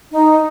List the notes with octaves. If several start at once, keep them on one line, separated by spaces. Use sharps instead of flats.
D#4